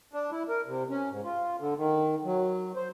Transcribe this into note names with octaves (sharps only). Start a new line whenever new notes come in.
D4
E4
A#4
C3
C#4
G#2
F4
D3
D#3
F#3
C5